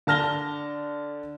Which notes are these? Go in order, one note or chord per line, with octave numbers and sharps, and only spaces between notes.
D3 A5 F6 A#6 G7